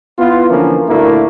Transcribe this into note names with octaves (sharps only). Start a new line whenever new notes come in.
B3 E4 F4
D3 E3 F3 A#3 C#4
D2 A#2 A3 A#3 E4